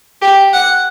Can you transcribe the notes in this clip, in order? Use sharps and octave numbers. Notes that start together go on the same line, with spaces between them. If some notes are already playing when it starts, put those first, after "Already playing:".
G4
F#5